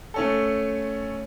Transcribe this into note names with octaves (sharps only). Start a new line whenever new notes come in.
A3 C#4 A4